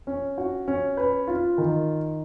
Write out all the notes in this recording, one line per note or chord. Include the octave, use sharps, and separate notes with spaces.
C#4
F#4
C#4
B4
F4
D#3